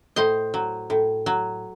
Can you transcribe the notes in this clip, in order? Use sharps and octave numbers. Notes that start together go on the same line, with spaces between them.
A2 C5 D#5
F#3
A2
F#3